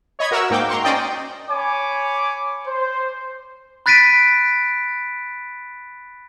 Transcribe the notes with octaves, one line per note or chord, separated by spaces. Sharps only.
C#5 D#5 B5 G#6
F#4 A#4 E5 F#5 C#6 E6
G#2 A#3 G5 D6 G6
A#5 C6 C#6
C#4 C5 D5 D#5 G5
C#5 G#5 B5 D6
C5
B5 F#6 A6 B6 D7 D#7